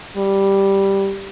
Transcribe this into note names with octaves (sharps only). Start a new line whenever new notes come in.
G3